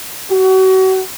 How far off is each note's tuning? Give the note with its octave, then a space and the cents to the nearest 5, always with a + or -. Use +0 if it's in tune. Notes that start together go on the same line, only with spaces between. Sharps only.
F#4 +35